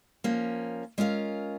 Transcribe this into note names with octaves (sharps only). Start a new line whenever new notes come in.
F3 A#3 C#4
G#3 C#4 F4 A#4 F5